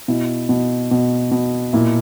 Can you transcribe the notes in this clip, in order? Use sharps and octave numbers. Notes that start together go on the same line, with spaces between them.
B2 E4
B2
B2
B2
A#2 E4